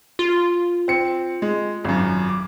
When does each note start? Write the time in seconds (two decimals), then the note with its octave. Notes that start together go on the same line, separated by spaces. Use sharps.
0.19 F4
0.88 C4 C#7
1.42 G#3
1.84 G#1 F#2
2.29 D6